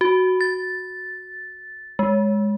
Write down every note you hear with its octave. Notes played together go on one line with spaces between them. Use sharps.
F#4
A6
G#3